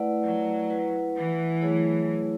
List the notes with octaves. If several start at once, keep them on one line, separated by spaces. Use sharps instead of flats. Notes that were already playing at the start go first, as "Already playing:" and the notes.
Already playing: A3 E4 B4 D5 F#5
F#3
E4 B4 F#5
E3
F#3 A3 E4 G#4 C#5